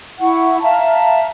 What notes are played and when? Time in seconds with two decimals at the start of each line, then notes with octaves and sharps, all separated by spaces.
0.21 E4 F#5 C#6
0.61 E5 F5 A5 A#5